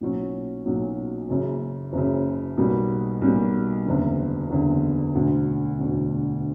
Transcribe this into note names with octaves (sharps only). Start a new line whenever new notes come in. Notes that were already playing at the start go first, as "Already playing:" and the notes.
B1 A#2 F#3 C#4
B1 A#2 F#3 C#4
F#1 F#2 C#3
F#1 F#2 C#3
B1 B2 G3 A#3
B1 B2 G3 A#3
F#1 E2 D3
F#1 E2 D3
E1 D2 D3
E1 D2 D3